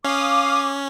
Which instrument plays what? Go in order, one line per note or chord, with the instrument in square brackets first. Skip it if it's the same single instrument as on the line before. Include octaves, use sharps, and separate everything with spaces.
[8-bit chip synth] C#4 [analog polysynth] F5 D#6 [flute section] D6